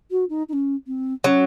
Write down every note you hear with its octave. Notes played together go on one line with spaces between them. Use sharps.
F#4
D#4
D#4
C#4
C4
F#3 C#4